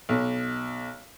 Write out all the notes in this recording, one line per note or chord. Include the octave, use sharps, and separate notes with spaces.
B1